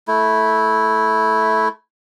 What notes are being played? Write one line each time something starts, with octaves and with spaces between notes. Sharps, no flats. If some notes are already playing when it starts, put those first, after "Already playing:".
A3 E4